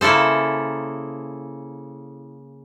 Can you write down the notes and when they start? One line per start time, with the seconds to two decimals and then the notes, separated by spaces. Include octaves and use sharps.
0.01 C#3 A#3 E4 A4 C5